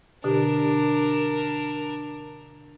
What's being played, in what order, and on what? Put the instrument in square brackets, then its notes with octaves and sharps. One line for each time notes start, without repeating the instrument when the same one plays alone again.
[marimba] B2 D3 G4 [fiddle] D4 A#4